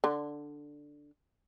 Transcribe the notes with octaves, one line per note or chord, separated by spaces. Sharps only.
D3